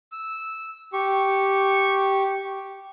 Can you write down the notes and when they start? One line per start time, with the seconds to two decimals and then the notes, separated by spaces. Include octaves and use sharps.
0.12 E6
0.93 G4 C#6